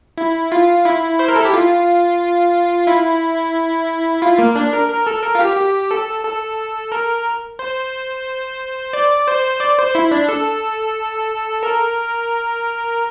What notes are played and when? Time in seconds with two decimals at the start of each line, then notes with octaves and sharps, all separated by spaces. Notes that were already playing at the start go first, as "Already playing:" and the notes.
0.18 E4
0.52 F4
0.85 E4
1.19 C5
1.28 A#4
1.36 A4
1.45 G4
1.53 F4
2.87 E4
4.22 F4
4.39 A#3
4.55 D4
4.73 A#4
4.89 A#4
5.07 A4
5.23 A#4
5.35 F4
5.40 G4
5.57 G4
5.91 A4
6.24 A4
6.92 A#4
7.59 C5
8.93 D5
9.28 C5
9.60 D5
9.78 C5
9.95 E4
10.11 D4
10.29 A4
11.63 A#4